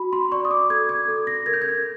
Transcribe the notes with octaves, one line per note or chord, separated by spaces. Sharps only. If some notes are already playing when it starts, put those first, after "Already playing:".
Already playing: F#4 B5
C6
D5 C#6
D#6
D6
A4 G#6
G#6
A4
A#6
A#4 G#6
G6
G#6